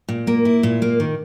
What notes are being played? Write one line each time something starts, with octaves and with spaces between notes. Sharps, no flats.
A#2
A#3
E4
A#2
A#3
D#3